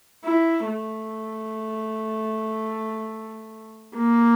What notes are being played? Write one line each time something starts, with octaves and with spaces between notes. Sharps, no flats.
E4
A3
A#3